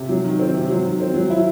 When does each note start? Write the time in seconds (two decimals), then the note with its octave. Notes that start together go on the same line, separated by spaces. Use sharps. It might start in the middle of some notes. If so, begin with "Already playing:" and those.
Already playing: C3
0.09 F#3
0.24 D#3
0.39 C4
0.54 C3
0.69 F#3
0.84 D#3
1.00 C4
1.14 F#3
1.30 E4